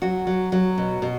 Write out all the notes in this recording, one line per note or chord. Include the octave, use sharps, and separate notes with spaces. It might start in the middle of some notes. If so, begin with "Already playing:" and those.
F#3 F#4
F#3
F#3
B2
B2